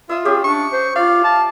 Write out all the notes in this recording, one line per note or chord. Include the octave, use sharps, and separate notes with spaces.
F4 D#5 E5
C#4 G4 G#4
D4 C#6
C5
F4 D5 F5
A5